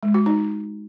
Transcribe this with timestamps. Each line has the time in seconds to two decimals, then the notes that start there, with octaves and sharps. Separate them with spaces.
0.03 G#3
0.14 F#4
0.26 D#4